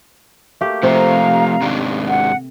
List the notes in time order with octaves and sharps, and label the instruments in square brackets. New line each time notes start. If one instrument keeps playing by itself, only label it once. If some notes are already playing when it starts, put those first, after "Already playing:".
[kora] A3 A#3 G4
[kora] C3 [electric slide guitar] F3 A3 [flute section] F5 A#5
[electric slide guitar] G#2 D#3 D4
[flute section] F#5